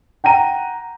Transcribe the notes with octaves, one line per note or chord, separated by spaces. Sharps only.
F#5 G5 A#5 D#7